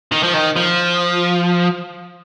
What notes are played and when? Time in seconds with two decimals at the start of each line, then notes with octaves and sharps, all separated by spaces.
0.12 D#3
0.23 F3
0.34 D#3
0.56 F3